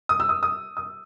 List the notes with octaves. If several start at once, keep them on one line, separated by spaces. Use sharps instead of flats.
D#6
E6
D#6
D#6
D#6